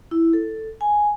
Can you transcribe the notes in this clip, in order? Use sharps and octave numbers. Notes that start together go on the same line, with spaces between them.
E4
A4
G#5